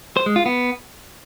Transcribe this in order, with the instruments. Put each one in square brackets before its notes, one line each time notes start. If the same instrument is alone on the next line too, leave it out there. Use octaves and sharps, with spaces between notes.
[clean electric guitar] C5
G#3
F4
B3